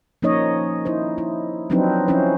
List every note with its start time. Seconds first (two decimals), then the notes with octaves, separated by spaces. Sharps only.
0.22 F3 A#3 C#4 D#4 C#5 D#5
0.85 D#4 E4 C5
1.18 E4
1.70 F3 F#3 C4 D4 D#4 B4
2.08 F3 C#4 E4 C5